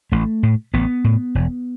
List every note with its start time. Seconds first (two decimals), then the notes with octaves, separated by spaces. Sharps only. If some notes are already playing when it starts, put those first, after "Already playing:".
0.12 A1 A3
0.43 A2
0.74 A1 B3
1.04 A2
1.35 E1